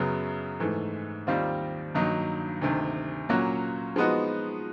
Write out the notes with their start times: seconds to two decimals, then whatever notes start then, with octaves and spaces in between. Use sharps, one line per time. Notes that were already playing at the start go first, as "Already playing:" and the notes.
Already playing: F#2 C#3 F#3 B3
0.60 G#2 E3 A3
1.27 D#2 D#3 G3 C4 F4
1.95 G2 D#3 F#3 A#3 D#4
2.61 D2 C3 D#3
3.29 A#2 F#3 A#3 C#4 F#4
3.96 F3 G#3 B3 D#4 F#4